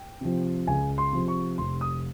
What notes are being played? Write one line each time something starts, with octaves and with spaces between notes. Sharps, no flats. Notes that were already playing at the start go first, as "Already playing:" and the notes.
Already playing: G5
C3 F3
C#2 G#5
C6
C3 F3
C#6
F1 C6
D#6